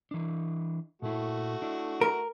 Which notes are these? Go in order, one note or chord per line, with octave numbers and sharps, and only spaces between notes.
E3 D4
A#2 A3 E4 F#4
D4 E4
A#4